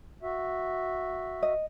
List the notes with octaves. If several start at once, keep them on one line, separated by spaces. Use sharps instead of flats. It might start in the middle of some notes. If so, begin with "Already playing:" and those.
F#4 E5
D#5